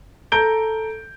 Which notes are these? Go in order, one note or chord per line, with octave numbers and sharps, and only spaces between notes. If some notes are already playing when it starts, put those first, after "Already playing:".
A4 A#5 G6 D7 G7